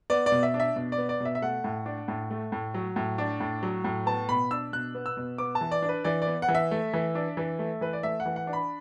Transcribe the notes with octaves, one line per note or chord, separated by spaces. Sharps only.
B3 D5
D5
B2
E5
D4
E5
B2
D5
B3
D5
B2 E5
E5
A3 F#5
A2
D4
A2
A3
A2
F#3
A2
D4
A2
F#3
A2
B3 A5
B2 B5
D4 E6
B2 F#6
B3
E6
B2
B3 D6
A5
E3
D5
D4
B4
E3 D5
D5
B3
F#5
E3
E5
A3
E3
D4
E3
A3
E3 B4
D5
A3 E5
F#5
E3
F#5
D4
B5